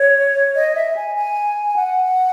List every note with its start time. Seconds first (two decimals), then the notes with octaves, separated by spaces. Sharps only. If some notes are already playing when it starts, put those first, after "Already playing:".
Already playing: C#5
0.55 D#5
0.75 E5
0.96 G#5
1.15 G#5
1.76 F#5